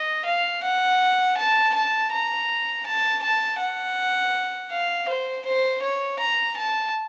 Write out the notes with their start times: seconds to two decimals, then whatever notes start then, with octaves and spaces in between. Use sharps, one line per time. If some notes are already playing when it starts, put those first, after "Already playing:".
Already playing: D#5
0.26 F5
0.63 F#5
1.37 A5
1.74 A5
2.12 A#5
2.86 A5
3.23 A5
3.60 F#5
4.72 F5
5.08 C5
5.46 C5
5.83 C#5
6.19 A#5
6.57 A5